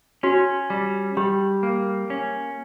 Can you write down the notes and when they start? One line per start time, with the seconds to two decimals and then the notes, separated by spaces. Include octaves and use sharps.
0.23 C#4 F#4
0.70 G3
1.17 G3 G4
1.63 A#3
2.10 C#4